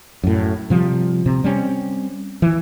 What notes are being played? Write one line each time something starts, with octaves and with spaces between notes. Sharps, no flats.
F#2 A2
C3 F3 G3
C3 C4
G3 C4 C#4
E3